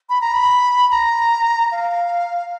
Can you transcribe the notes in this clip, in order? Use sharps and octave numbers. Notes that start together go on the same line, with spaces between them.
B5
A#5
B5
A#5
F5